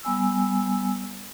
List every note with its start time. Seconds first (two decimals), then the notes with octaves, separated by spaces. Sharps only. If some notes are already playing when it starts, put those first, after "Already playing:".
0.03 G3 B3 G#5 E6